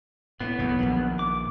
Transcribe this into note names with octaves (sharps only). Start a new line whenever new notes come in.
A2 B3
B1 E2 A2
A#1 D#3
D6